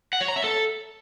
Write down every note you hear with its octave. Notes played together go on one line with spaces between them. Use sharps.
F#5
C#5
A#5
E5
A4